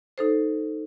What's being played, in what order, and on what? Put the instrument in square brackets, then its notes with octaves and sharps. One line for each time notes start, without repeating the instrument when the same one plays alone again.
[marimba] D#4 A4 C5